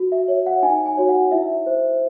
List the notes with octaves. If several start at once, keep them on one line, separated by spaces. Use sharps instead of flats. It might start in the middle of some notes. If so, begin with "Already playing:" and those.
Already playing: F#4
E5
C#5
F#5
D#4 G#5
G#5
F#4 C#5
F#5
E4 E5
C5